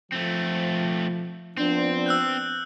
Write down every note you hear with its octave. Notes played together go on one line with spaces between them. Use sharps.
F3 A3 C4
F3 B3 C4 D4
E6 F#6 G6